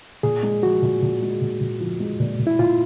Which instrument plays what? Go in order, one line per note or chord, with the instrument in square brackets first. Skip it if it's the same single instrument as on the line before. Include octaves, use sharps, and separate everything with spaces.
[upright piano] A#2 [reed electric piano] G#4
[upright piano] G#3
[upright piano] F3 [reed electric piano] F#4
[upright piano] A#2
A#2
G#3
A#2
A#2
F3
G#3
A#2
A#2
[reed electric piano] E4
[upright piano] A#2 [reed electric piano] F4